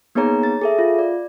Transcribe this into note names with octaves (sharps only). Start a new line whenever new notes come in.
A#3 B3 D#4 G#4 C#5 A#5
A6
G#4 A4 E5
F4
D5